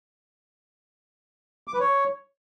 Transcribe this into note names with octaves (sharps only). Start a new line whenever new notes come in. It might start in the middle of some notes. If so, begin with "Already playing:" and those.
D6
B4
C#5